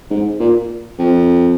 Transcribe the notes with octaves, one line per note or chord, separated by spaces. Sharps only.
G#2
A#2
F2